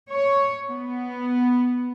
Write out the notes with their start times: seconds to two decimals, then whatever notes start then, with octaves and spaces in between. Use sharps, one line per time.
0.12 C#5
0.70 B3